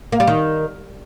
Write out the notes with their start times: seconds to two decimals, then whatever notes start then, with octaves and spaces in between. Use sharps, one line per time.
0.12 A#3
0.20 G3
0.27 D#3